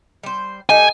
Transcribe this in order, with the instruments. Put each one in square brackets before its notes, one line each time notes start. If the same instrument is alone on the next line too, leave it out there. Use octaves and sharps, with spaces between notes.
[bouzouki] G3 C5
[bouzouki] G3 A3 D#4 [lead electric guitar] G#5